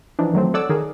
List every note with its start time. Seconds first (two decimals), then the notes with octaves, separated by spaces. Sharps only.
0.19 E3 F3 D4 D#4
0.33 D#3 F#3 A3 C4
0.54 A4 C#5 D5 F#5 D6 E6
0.69 D#3 G#4 A#4